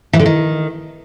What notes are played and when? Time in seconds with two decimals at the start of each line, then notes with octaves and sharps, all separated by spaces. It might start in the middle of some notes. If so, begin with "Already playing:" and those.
0.13 E3
0.19 D3
0.26 D#3